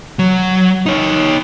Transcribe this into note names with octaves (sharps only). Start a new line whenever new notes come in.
F#3
D#4 C#5